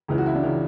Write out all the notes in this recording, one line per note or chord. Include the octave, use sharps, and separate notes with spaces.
C#2 C#3 E3
F#4
E4
D4
C#3 E3